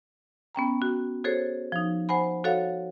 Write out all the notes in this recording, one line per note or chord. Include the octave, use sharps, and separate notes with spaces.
B3 C#4 G5 A#5
F#4
F#4 G#4 A4 C5 C#5
F3 D#4
C5 F#5 G#5 B5
F#4 A4 C#5 F5 F#5